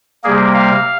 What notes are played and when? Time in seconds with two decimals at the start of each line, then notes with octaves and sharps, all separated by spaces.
0.24 C3 G3 A#3 G#4
0.54 F5